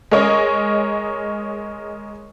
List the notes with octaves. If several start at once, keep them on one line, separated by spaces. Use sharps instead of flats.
G#3 A#4 C#5 D#5